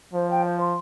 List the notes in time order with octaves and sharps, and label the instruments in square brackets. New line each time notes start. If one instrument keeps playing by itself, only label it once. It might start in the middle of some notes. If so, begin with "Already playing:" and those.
[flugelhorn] F3 [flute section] C5
[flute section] G5
C5
C6